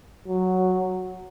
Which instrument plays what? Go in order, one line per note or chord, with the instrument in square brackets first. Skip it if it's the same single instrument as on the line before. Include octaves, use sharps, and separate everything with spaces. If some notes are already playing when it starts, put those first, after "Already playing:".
[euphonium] F#3